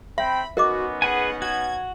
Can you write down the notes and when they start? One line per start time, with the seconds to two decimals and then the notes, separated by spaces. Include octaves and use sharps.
0.18 C4 E5 G5 B5
0.57 B3 C#4 D#4 F#4 A#4 D#5 D6
1.02 G#4 B4 F#5 G#5
1.42 F#4 G#6